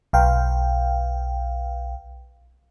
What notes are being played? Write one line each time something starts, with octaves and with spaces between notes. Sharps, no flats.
B1 F5 G5